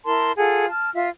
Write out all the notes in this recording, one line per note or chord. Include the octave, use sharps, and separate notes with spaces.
E4 A#4 A5 C6
F4 G#4 A4 F#5
A5 F6
F4 E5